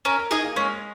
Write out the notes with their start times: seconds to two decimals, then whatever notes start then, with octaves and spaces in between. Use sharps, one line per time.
0.05 C#4 A#4
0.18 A#4
0.31 D#4 G#4 D#5 G#5
0.44 A#3
0.56 G#3 C#4